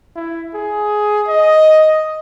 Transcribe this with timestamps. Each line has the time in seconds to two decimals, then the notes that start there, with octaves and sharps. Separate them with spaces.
0.16 E4
0.55 G#4
1.28 D#5